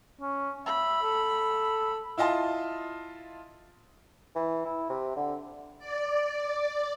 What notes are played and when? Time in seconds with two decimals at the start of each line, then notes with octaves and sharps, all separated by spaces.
0.21 C#4
0.66 E5 B5
1.02 A4
2.17 E4 F4 D#5 A5 C6
4.35 E3
4.65 E4
4.90 C3
5.16 D3
5.78 D5